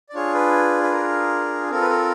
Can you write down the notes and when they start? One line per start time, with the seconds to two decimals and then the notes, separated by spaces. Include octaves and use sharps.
0.09 D5
0.14 D4 F4 G#4 C#5
0.34 B4
0.83 B4
0.92 A#4
1.70 C4 F4 A4 A#4
1.81 B4
1.90 A#4